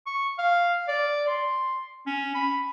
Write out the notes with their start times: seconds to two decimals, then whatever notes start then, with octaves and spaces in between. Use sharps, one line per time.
0.06 C#6
0.38 F5
0.88 D5
1.27 C6
2.06 C#4
2.35 B5